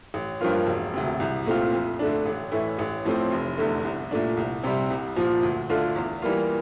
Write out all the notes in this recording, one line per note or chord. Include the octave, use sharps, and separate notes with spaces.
A1
G2 F3 A#3 F4
E1
D2 C3
C2
A#2 A3 C4 F4
F2
D3 A3 D4
A1
A2 E3 A3 E4
A1
A2 F3 A3 C4
F1
E2 D3 A3
C2
A#2 A3 D4
C2
C3 G3
C2
A#2 F3
D2
D3 A3 D4 F4
E2
E3 G3 A#3 F4